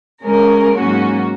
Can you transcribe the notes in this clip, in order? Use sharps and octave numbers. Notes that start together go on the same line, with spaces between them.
C#3 G#3 C#4 A#4
G#2 F#3 A#3 C#4 F#4